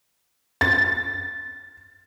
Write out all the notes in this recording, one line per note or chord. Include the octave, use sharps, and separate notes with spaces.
A6